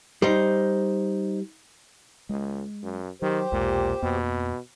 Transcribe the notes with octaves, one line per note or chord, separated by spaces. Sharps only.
G3 D#4 C5
C#2 G#3
F#2
D#3 F#3 G4 C5
B1 E2 A#2 G#3
F2 B2 A#3